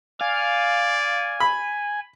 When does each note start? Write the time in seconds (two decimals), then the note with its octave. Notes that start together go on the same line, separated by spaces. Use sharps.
0.21 D5 F5 G#5
1.40 B5